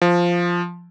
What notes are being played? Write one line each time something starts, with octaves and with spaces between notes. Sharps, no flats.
F3